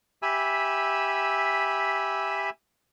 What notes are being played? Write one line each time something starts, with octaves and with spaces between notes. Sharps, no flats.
G4 E5 G#5 B5 E6